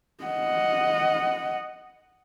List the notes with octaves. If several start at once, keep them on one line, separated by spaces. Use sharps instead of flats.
D#5 F#5